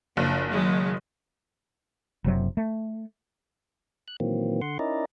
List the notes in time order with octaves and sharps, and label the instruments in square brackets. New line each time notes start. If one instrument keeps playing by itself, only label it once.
[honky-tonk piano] F#1 [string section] F3 D4
[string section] D#3 F#3 G#3
[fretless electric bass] F#1 C3 F#3
A3
[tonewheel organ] F#6
A#2 D#3 E3 F#3 A#3 C4
D3 F#5 C6
C#4 D#4 E4 A#4 D5 D#5